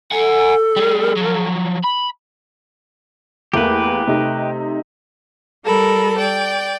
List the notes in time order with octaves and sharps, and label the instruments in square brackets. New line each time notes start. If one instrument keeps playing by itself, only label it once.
[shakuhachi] A4 [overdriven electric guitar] F#5 G#5
[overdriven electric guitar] G3 G#4
F3 F#3
B5
[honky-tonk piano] E2 A3 A#3 [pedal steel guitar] G4 B4
[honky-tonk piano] C3 A3 D#4
[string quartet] G3 A4 A#4 B5
D5 G5